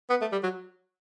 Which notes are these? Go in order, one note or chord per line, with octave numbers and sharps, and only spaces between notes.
B3
A3
G3
F#3